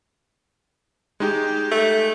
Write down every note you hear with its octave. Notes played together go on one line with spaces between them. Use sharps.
G#3 D#4 G4
A3